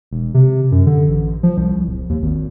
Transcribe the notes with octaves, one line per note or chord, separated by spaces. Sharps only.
E1
C3
F#2
D3
A1
F3
C2
D1
D#2
G#1